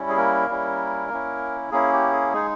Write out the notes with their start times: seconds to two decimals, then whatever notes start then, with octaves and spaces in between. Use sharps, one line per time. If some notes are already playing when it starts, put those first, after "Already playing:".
Already playing: G3 C#4 E4
0.09 G#4
0.17 A#3 A#4
0.48 G3 C#4 E4
1.09 A#3 C#4 E4
1.72 A#3 C#4 E4 G#4
1.93 G4
2.12 G#4
2.33 G#3 D#4 G#4